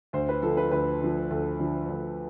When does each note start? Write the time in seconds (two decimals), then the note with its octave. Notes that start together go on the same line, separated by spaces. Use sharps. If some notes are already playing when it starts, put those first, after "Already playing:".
0.13 D2 C5
0.29 B4
0.42 D3 F3 A4
0.57 B4
0.71 D2 B4
1.02 D3 F3
1.31 D2 A4
1.60 D3 F3
1.89 D2